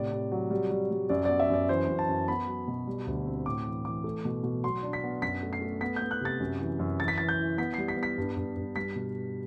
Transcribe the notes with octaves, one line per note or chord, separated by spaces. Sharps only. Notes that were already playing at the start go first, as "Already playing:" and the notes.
Already playing: A2 C3 D5
C3
F#3
G3
G3
G3
F#2 D5
B3 D5
E5
F#2 D5
E3 C5
F#2
A5
F#2
B3 B5
F#3
B2
G3
D2
C4
A2 D6
E3
E3 D6
A3
B2
B2
F#3 C6
D4
B6
B3
F#2 B6
A3
C7
A3
B3 B6
G6
B3
F#6
C3 A6
F#2
E3
F#2
E3 A6
B6
E3 A6
G6
E4
B3 B6
G3 C7
B6
B3
B6
G2
G2
G2
G3 B6
B2